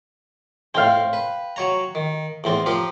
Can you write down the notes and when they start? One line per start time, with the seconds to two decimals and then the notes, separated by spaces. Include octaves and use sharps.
0.75 A2 C4 F5 G5
1.13 B4
1.56 F#3 C#5 A#5
1.95 D#3
2.44 E2 A2 C4
2.66 F3 G4 A#4